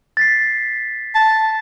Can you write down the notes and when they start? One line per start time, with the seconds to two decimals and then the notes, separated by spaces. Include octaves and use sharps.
0.17 A6 B6 C7
1.15 A5